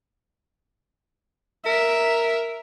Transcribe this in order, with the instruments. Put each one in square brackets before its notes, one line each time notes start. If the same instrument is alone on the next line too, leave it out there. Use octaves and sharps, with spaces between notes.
[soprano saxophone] A#4 [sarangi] E5